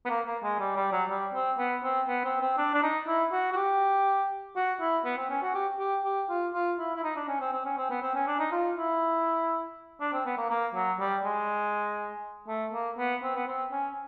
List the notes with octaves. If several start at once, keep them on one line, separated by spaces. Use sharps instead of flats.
B3
A#3
A#3
G#3
G3
G3
F#3
G3
C4
B3
C4
B3
C4
C4
D4
D4
D#4
E4
F#4
F#4
G4
F#4
E4
B3
C4
C#4
F#4
G4
G4
G4
F4
F4
E4
E4
D#4
D4
C#4
C4
C4
C#4
C4
B3
C4
C#4
D4
D#4
F4
E4
D4
C4
B3
A#3
A#3
F#3
G3
G#3
A3
A#3
B3
C4
B3
C4
C#4